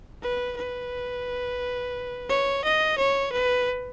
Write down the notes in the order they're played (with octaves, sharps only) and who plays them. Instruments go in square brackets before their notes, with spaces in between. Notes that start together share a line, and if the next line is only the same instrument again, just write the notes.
[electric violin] B4
B4
C#5
D#5
C#5
B4